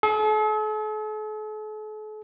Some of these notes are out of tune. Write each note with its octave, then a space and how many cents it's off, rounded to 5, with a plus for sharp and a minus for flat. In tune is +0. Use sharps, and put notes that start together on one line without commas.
A4 -45